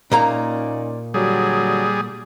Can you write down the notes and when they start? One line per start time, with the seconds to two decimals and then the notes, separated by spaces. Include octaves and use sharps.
0.11 A#2 A#3 C#4 D#4 D5 A#5
1.14 D3 F#3 G3 G#4